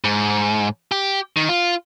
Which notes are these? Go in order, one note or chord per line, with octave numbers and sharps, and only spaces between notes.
G#2
G4
D#3
F4